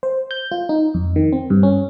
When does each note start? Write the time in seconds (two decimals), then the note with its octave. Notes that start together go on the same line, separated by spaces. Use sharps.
0.03 C5
0.31 G6
0.51 F4
0.69 D#4
0.94 F2
1.16 D#3
1.33 C4
1.50 G2
1.63 C#4